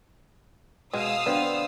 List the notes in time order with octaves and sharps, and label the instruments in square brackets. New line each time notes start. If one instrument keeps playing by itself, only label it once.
[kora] B2 [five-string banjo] G#3 [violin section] F5 D#6 E6
[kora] D3 C4 [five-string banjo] B3